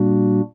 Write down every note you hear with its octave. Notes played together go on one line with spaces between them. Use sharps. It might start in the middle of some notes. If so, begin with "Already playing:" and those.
Already playing: A#2 G3 A#3 D4 F#4